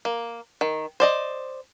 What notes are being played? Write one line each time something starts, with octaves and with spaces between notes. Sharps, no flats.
A#3
D#3
C5 D5 D#5